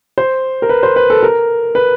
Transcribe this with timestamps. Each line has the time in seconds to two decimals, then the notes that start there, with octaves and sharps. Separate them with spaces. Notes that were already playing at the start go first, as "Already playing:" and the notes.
0.18 C5
0.62 A#4
0.69 B4
0.83 C5
0.96 B4
1.10 A4
1.23 A#4
1.75 B4